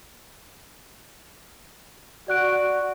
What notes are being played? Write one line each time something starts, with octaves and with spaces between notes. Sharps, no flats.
F#4 D5 F#6 D7